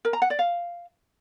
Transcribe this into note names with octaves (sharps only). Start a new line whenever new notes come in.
A#4
A#5
F#5
D5
F5